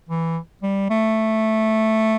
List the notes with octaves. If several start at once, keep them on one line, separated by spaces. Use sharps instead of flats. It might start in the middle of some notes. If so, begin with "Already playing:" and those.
E3
G3
A3